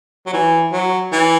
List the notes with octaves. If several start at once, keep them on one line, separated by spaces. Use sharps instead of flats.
F#3
E3
F#3
E3